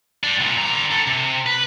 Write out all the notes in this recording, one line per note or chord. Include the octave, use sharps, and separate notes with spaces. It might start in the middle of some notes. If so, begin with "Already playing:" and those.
G3 D4
C2 A#2
D3 A#5
A4 C5
C3
B4